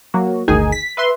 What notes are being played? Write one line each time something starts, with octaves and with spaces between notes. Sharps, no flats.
F#3 A#3 F#4
G1 D2 D#3 D#4 G#4 G#5
B6
B4 E5 C6